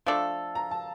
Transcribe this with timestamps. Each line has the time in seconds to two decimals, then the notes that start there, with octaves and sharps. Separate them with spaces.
0.06 F3 A3 D4 A4 F5
0.55 A#5
0.71 A5